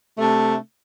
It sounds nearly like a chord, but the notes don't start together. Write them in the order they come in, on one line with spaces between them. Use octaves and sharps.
A3 C3 D4